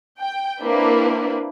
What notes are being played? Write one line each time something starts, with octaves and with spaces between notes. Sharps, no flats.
G5
A#3 C4 D4 E4 B4